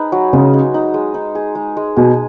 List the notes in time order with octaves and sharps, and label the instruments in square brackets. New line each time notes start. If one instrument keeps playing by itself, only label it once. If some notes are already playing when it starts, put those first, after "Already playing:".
Already playing: [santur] D#4 G#4 B4
F#3
[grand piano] C#3 [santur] G#3
[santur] D#4
D#4
G#3
D#4
G#4
G#3
G#3
[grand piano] B2 [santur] G#4